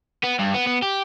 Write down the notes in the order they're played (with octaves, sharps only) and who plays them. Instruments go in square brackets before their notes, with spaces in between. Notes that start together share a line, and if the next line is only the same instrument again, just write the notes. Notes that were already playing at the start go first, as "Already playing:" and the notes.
[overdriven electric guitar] B3
G2
B3
B3
G4